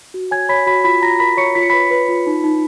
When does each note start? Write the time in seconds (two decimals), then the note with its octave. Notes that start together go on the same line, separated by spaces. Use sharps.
0.14 F#4
0.31 C#5 G#5 G#6
0.49 C#5 B5 B6
0.67 F#4 B5 B6
0.84 F4 B5 B6
1.02 F4 A#5 A#6
1.20 A#4 B5 B6
1.37 C#5 C#6 C#7
1.55 F4 B6
1.63 C#7
1.70 B4 B5 B6
1.91 B4
2.08 F4
2.27 D#4
2.44 D#4